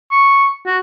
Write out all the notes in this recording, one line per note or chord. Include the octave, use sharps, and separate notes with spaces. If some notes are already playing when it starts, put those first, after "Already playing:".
C#6
F#4